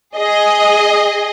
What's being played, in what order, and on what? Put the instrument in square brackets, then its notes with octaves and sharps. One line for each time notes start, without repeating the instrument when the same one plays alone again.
[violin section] G#4 D#5